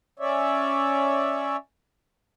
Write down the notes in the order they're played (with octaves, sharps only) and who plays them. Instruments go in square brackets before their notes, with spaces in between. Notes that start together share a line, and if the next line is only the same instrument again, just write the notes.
[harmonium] C#4 C#5 D5 E5